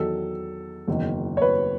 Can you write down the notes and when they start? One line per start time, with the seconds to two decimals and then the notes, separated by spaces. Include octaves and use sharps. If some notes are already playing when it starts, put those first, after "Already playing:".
Already playing: E2 D#3 F#3 A4
0.88 F#1 E2 D#3
1.37 C#5
1.42 B4